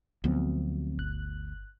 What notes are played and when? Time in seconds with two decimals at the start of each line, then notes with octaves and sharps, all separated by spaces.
0.24 D2 F3 F#3 B3 C4
0.98 G1 F#6